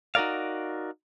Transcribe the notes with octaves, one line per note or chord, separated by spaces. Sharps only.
D#4 F#4 G#4 A#4 D5 F5